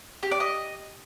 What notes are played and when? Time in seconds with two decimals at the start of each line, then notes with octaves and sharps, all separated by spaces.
0.23 G4
0.31 D5
0.40 D#5